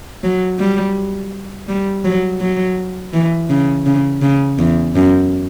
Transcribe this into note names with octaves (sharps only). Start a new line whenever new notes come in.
F#3
G3
G3
F#3
F#3
E3
C#3
C#3
C#3
E2
F#2